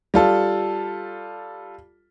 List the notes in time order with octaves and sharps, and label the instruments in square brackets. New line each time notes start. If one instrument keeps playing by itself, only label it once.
[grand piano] G3 F4 A4